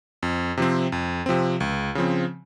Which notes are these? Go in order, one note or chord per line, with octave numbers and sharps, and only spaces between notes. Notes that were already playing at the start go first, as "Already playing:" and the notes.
F2
C3 F3 C4
F2
C3 F3 C4
C#2
C#3 F3 C4